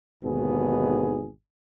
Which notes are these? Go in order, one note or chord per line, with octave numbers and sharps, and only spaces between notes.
G#1 D#2 B2 D3 B3 G#4